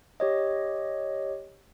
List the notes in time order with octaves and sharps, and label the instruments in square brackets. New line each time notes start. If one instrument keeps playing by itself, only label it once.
[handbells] G4 C#5 D#5